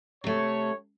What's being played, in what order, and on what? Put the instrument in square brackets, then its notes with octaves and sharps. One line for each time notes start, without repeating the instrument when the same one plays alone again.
[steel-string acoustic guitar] C3 A3 [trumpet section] C#5